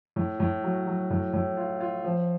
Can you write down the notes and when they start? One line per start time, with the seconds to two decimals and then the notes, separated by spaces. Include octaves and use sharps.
0.16 A2
0.40 A2
0.64 F#3
0.87 F#3
1.11 A2
1.33 A2
1.57 F4
1.80 F4
2.04 F3